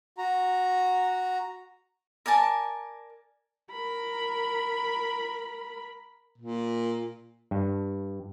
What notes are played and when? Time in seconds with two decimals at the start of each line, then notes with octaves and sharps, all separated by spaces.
0.18 F#4 A#5
2.26 A#4 D5 G#5 A5
3.72 A#4 B5
6.38 A#2
7.51 G2